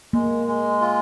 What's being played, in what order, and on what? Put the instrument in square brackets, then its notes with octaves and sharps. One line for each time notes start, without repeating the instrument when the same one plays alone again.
[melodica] G#3 [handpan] A#3
[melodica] G#3
F4